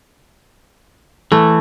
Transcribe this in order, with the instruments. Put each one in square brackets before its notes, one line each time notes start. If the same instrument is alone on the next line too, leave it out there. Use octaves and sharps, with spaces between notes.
[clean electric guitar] E3 [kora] A3